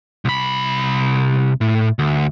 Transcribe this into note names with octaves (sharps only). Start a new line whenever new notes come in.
C2 B5
A2
D2